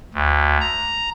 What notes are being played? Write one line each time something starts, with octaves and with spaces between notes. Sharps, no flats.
D2
A#5